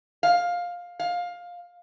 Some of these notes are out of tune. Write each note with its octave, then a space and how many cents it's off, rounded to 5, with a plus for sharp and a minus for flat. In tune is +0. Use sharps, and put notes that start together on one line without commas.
F5 +15
F5 +15